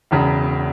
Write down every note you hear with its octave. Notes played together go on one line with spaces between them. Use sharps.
E1 E2 C#3